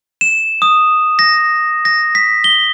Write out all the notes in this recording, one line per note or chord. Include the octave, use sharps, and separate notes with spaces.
E7
D#6
A#6
A#6
B6
G7